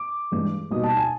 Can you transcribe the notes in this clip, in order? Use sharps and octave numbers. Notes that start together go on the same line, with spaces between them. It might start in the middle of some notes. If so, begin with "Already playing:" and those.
Already playing: D6
G2 E3 G#3
B2 G3 A#3 D#4 D#6
A5
G#5